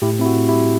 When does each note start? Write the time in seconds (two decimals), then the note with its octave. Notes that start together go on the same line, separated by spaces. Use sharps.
0.02 A2 E4 G4
0.19 C4 E4
0.26 F#4
0.37 A2
0.49 E4 G4
0.53 G3